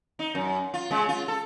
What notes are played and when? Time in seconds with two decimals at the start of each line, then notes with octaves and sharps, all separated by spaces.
0.19 D#4
0.35 F#2
0.74 F4
0.91 C#3 G#3
1.09 F4
1.28 A4